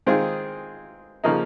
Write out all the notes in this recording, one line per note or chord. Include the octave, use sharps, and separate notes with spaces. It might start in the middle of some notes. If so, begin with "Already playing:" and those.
D#3 G#3 C4 F4 G#4
C#3 F3 A#3 D#4